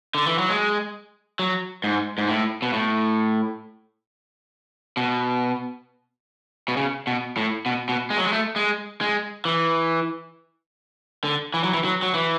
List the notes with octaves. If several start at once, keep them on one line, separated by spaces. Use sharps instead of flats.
D3
E3
F#3
G#3
F#3
G#2
G#2
A2
B2
A2
B2
B2
C#3
B2
A2
B2
B2
G#3
F#3
G#3
A3
G#3
G#3
E3
D3
E3
F#3
E3
F#3
F#3
E3